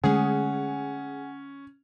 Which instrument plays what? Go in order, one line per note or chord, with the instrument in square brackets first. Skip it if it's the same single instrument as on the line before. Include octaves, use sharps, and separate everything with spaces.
[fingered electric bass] D3 G#3 A3 [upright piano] C#4 [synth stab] G#4 [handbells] F#5 G#5